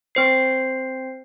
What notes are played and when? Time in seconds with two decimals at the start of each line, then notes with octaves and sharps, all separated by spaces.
0.15 C4 C5 C7